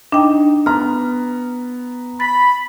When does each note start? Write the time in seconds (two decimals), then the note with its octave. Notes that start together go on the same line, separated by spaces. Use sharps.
0.12 D4 D#4 G5
0.66 B3 A#5 F6
2.20 B5 A6